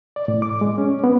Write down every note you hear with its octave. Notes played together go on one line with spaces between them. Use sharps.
D5
A2
D6
G#3
C#4
B3